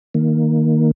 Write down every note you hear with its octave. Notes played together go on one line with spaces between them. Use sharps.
D#3 A#3